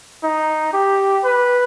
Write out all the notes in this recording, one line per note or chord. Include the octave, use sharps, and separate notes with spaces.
D#4
G4
B4